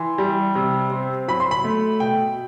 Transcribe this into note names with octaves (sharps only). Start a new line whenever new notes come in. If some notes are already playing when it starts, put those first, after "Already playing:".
Already playing: E3 C6
G3
C3
C4
F#3 B5
C6
B5
A3
B2 G5